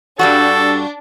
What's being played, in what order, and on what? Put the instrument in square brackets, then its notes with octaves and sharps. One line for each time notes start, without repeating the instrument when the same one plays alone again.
[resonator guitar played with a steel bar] G2 G3 F#4 [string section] D4 [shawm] A4